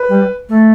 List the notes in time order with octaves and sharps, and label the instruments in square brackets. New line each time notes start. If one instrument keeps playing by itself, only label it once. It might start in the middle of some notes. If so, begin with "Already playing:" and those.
Already playing: [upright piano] B4
[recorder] G3
A3